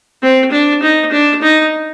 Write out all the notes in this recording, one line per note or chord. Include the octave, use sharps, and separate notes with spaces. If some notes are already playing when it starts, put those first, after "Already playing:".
C4
D4
D#4
D4
D#4